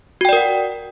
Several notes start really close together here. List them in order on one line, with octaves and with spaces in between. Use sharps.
F#4 G5 D5 A#4 F#5